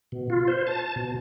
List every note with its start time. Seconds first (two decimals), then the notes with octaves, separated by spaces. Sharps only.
0.12 B2
0.30 F4
0.48 C5
0.67 A5
0.96 B2